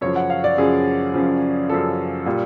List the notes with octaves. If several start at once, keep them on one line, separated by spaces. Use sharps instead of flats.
F#2 C#3 F3 C#5
F#5
F5
D5
F#2 C#3 F3 G#4
F#2 C#3 F3
F#2 C#3 F3 A4
A#2 G3